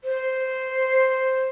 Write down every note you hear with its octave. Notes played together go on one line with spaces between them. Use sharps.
C5